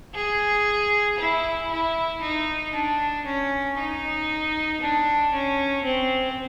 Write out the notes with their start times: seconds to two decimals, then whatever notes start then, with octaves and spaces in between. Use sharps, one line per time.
0.15 G#4
1.19 E4
1.70 E4
2.22 D#4
2.74 D4
3.26 C#4
3.78 D#4
4.81 D4
5.33 C#4
5.85 C4